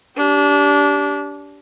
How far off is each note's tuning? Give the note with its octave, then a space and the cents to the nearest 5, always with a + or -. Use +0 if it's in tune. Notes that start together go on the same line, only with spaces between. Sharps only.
D4 -25 G4 -10